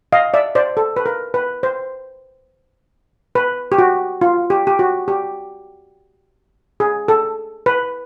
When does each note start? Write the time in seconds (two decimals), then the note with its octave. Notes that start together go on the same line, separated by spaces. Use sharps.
0.12 D#5 F5
0.34 D5 E5
0.55 C5 D5
0.77 A4
0.97 B4
1.06 A#4
1.34 B4
1.63 C5
3.35 B4
3.72 G4
3.78 F#4
4.21 F4
4.50 G4
4.67 G4
4.79 F#4
5.08 G4
6.80 G#4
7.08 A4
7.66 B4